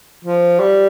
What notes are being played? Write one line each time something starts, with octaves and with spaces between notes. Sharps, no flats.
F3
G3